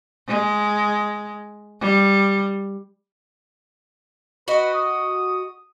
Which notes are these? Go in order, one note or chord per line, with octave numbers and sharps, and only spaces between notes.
G#3
G3
F#4 B4 D#5
D#6